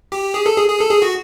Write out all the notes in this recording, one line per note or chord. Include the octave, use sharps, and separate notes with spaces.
G4
G#4
A4
G#4
G#4
A4
G#4
F#4